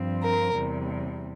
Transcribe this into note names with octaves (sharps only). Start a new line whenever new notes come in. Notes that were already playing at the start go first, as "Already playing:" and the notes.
Already playing: G2 F3 C4
A#4
E2 C3 G3